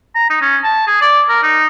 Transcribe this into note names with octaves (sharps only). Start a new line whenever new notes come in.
A#5
D#4
C#4
A5
G#4
D5
A#4
D#4